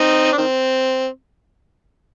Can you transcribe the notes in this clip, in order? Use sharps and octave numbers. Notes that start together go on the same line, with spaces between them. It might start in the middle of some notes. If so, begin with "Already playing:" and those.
Already playing: C4 D#4
D4
D#3 C4